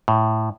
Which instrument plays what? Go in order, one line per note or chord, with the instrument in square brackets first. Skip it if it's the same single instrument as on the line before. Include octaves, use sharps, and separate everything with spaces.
[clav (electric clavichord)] A2